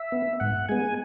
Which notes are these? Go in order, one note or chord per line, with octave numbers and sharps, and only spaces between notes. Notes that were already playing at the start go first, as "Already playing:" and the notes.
Already playing: E5
B3
G#2 F#5
G#3 B3 G#5